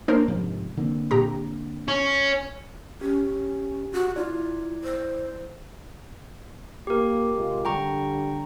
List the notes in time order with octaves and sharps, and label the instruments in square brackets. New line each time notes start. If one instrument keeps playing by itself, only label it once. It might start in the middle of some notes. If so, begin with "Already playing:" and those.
[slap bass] A#3 [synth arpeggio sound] D4 A#4 C5
[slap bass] F2 G#2 C3
D3 A#3 C4
[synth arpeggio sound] A#2 G4 A#5
[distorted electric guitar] C#4
[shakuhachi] C#4 [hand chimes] G4
[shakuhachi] F#4
[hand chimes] E4 D5 [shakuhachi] F4
[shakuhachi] C5
[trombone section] A#3 F4 [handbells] G4 A#4
[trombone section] C3 G#3 F4
[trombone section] D3 G3 [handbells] G5 A#5 C#6